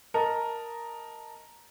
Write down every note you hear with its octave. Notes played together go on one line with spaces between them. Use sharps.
A#4 D#5 A5 A#5